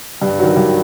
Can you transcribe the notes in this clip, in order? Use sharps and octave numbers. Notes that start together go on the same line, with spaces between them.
G2
D#3 F#3
G2